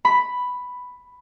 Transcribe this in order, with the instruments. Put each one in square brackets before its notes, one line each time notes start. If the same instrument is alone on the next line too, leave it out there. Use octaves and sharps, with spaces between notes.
[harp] B5